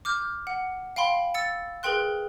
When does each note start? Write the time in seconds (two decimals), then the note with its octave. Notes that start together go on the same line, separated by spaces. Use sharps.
0.05 D6 F6 G6
0.47 F#5
0.96 F5 G5 B5 C6
1.34 E6 A6 C#7
1.83 G#4 A#4 B4 G5 C6 F#6